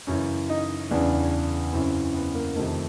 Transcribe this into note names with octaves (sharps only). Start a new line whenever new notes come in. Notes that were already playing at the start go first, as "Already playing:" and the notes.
F#2 C#3 E3 C#4
D#4
E2 C#3 E3 D4
F#2 C#3 E3 C4
B3
A#3
F2 C3 D#3 A3